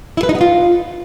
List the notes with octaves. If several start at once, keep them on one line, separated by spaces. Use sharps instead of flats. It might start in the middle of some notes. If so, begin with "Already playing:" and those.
E4
B4
D#4
B3
F4